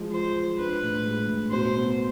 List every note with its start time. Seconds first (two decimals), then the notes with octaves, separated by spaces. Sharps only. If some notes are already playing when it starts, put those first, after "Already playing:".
Already playing: F3 G#3
0.13 F3 C5
0.36 F3
0.58 D4 B4
0.82 A2
1.05 G#3
1.28 A2
1.51 B2 C5
1.75 B3